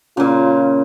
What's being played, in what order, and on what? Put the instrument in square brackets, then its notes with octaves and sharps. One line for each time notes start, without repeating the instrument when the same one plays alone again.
[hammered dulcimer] A#2 C#3 [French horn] F4